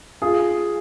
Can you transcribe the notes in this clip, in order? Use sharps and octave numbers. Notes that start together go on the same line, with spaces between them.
F4 G#4